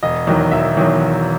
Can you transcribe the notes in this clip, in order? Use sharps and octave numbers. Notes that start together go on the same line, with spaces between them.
E1 D#5
E2 D#3 F#3
E1 E5
E2 D#3 F#3
E1